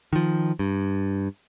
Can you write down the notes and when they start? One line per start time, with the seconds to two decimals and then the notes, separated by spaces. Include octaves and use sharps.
0.13 D#3 F3
0.59 G2